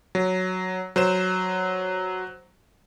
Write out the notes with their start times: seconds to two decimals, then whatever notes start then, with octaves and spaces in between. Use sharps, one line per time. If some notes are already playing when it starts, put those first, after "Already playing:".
0.15 F#3
0.96 F#3 C5 E7